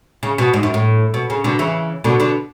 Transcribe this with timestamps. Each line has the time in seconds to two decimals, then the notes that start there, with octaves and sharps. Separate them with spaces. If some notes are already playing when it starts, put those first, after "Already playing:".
0.23 C#3
0.38 B2
0.54 G#2
0.63 F#2
0.74 A2
1.14 B2
1.30 C#3
1.44 B2 D3
1.59 C#3 E3
2.04 B2 D3
2.20 B2 D3